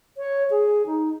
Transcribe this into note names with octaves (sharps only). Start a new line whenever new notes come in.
C#5
G#4
D#4